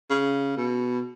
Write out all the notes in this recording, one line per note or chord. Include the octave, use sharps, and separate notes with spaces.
C#3
B2